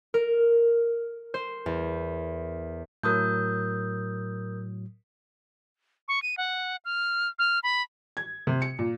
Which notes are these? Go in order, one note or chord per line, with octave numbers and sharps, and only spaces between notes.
A#4
C5
E2
A2 F#3 A#4 D#6 G6
C#6
D#7
F#5
F6
F6
B5
G#6
C3
C#7
A#2